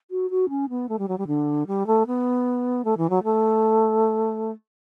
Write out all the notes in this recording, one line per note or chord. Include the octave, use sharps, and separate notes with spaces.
F#4
F#4
C#4
B3
A3
G3
F#3
G3
D3
G3
A3
B3
A3
E3
F#3
A3